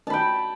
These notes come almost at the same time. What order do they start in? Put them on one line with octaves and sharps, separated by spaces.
A5 B5 G5